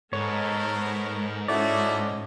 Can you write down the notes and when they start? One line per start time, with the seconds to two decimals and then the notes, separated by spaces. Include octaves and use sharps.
0.13 G#2 B3 A4 A#4 C#5
1.48 A3 C#4 E4 F#4 D5 D#5